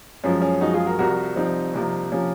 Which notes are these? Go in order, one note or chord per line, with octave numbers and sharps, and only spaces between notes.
F#2 F3 G#3 C#4
C#4
F#2 F3 G#3 D#4 F#4
F4 G#4
F#4 A#4
C2 C3 F3 F#4 A#4
C2 C3 F3 C4 D#4
C2 C3 F3 A#3
C3 F3 A#3 C#4